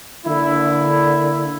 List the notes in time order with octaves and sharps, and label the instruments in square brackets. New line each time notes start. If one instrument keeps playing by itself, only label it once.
[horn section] D3 A#3 E4